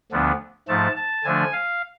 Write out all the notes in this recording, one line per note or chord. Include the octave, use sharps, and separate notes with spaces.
D2 D3 F3 B3 D4
G#2 F3 A3 A5
A5
D3 F3 A3 D4 G#5
F5